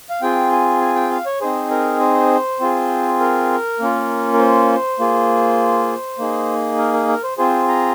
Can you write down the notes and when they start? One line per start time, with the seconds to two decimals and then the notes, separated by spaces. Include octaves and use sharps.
0.10 F5
0.22 C4 F4 G#4 G5
0.52 G#5
0.81 G#5
0.96 G5
1.11 F5
1.26 C#5
1.41 C4 D#4 G#4 C5
1.71 A#4
2.00 C5
2.60 C4 F4 G#4
3.20 A#4
3.79 A#3 C#4 F4
4.33 A#4
4.39 C5
4.99 A#3 F4 G#4
6.19 A#3 D#4 G#4
6.78 A#4
6.94 A#4
7.08 A#4
7.23 C5
7.38 C4 F4 G#4 C5
7.68 A#5